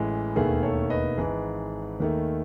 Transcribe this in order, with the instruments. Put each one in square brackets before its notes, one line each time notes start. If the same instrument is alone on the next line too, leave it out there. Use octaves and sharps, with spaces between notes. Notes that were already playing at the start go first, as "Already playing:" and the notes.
Already playing: [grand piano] A1 A2 E3 G#3
E1 D#2 D#3 A3 G#4 B4
A4 C#5
B4 D#5
G#1 G#2 E3 G#4 B4
D#2 D#3 A3